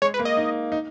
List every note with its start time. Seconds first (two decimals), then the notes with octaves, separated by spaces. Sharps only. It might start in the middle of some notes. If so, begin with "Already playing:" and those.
0.02 G#3 C#5
0.14 B4
0.19 A#3
0.25 D#5
0.37 D#4
0.72 D#4